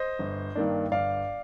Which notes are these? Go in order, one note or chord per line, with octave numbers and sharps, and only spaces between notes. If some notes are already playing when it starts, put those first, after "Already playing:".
Already playing: C5 D#5
G1
G2 D#3 A#3 D4
G1 D5 F5